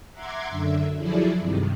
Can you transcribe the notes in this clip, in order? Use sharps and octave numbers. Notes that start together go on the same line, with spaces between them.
E5 F#5 A#5 C6 D6 G#6
F#2 D3 E5
F3 F#3 E4 G#4 A4 D5
G2 C3 D#3